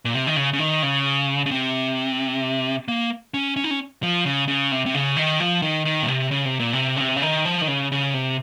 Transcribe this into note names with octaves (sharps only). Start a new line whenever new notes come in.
A#2
C3
D#3
C#3
C#3
D#3
C#3
C#3
C3
A#3
C#4
C#4
D#4
C#4
F3
C#3
C#3
C3
C3
C#3
D#3
F3
D#3
D#3
A#2
C3
C#3
C3
A#2
C3
C#3
C3
C#3
D#3
F3
D#3
C#3
C#3
C3